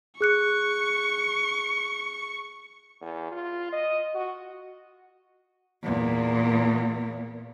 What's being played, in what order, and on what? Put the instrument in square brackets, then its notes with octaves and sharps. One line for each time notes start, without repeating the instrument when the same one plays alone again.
[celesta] G#4 F#6 C#7 [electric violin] C#6
[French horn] E2
F4
D#5
F#4
[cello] E2 A#2